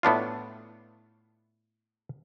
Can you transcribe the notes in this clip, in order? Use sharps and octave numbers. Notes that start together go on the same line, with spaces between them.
A2 B3 D4 F4